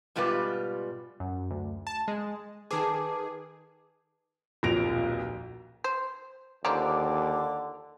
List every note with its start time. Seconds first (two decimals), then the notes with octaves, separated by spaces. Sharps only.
0.16 G#2 B2 G3 F4 G4 B4
1.20 F#2
1.50 D2
1.87 A5
2.08 G#3
2.71 D#3 G#4 A4 B4 D6
4.63 D#1 B1 F2 A#6 D7 F7
5.84 C5
6.65 D#2 D3 F3 C#4 A#5 D6